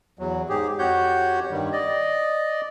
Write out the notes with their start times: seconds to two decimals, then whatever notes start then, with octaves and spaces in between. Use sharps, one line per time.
0.19 E2 F#3
0.49 G#2 G4 G#4
0.79 F2 F#4 G4 C#5 F#5 G6
1.50 G2 D#3 G3
1.72 D5 D#5